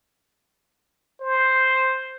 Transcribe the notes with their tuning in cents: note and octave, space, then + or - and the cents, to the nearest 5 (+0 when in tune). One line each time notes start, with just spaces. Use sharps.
C5 +0